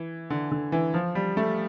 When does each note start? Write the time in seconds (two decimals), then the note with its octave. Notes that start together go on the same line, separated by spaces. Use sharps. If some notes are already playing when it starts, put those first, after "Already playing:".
Already playing: E3
0.30 D3
0.51 D3
0.72 E3
0.94 F3
1.15 G3
1.37 A3